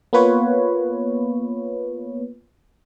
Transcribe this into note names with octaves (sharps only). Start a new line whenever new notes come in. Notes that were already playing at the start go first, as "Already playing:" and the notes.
A#3 B3 F4 B4 C#5